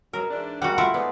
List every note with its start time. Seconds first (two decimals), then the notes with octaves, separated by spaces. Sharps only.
0.13 B2 F#3 A#4
0.30 G#2 E3 D4
0.62 G3 G#3 A#3 F#4 F#5
0.78 A3 E4 F4
0.94 G#2 B3 D5